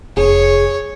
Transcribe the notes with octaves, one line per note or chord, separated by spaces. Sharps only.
F1 G#4 C#5